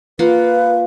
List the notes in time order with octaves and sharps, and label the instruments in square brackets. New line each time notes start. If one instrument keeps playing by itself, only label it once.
[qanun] A#3 F4 F#5 [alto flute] B4